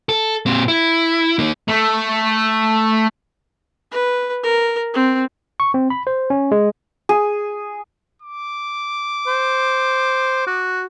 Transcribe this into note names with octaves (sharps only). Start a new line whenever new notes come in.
A4
A#2 C4
E4
A#3 D#4
A3
B4
A#4
C4
C#6
C4
B5
C5
C#4
G#3
G#4
D6
C5
F#4